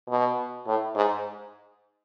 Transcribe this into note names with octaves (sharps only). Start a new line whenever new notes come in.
B2
A2
G#2